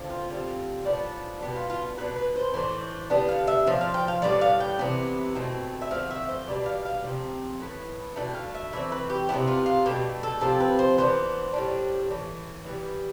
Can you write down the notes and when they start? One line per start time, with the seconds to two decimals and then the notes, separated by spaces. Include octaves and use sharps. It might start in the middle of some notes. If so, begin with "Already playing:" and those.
Already playing: D3 F3 C4
0.10 F4
0.29 D3 G3 C4
0.85 A2 F3 B3 D4
1.41 B2 B3 D4 G4
1.56 F4
1.70 F4
1.97 B2 B3 D4 B4
2.16 B4
2.36 C5
2.54 A2 E3 A3 D4 C5
3.10 D3 G3 B3 D4
3.29 F5
3.47 E5
3.67 A2 F3 D4 F5
3.81 F5
3.94 G5
4.08 F5
4.22 A2 G3 B3 D4 D5
4.41 F5
4.60 G5
4.79 C3 E3 B3 D4
5.35 B2 A3 C4
5.81 E5
5.91 D3 F3 A3 C4 F5
6.11 E5
6.29 C5
6.48 B2 G3 B3 D4 D5
6.66 F5
6.85 F5
7.04 C3 F3 C4
7.60 A2 E3 B3
8.16 B2 A3 D4 G5
8.35 F5
8.55 E5
8.73 E3 A3 C4 E5
8.92 B4
9.10 G4
9.29 C3 F3 B3 D4 E4
9.47 F4
9.66 F4
9.86 B2 A3 D4 G4
10.23 A4
10.41 C3 F3 C4 A4
10.61 B4
10.79 C5
10.98 E3 B3 D4 C5
11.54 A2 G3 D4
12.10 A2 E3
12.66 E3 G3 B3